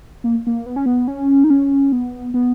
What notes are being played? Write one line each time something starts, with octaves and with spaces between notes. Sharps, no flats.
A#3
A#3
B3
C#4
B3
C#4
D#4
C#4
B3
B3